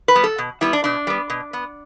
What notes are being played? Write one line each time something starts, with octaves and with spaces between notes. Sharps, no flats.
B4
G3 B3
A4
B2
G3 B3 E4
D4
B2 D4
G3 B3
B2
B3